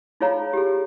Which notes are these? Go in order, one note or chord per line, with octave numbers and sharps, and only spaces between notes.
D#4 F4 G#4 C#5 F5 A#5
G4 G#4